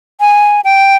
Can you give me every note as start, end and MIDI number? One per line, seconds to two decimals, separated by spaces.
0.20 0.61 80
0.65 0.96 79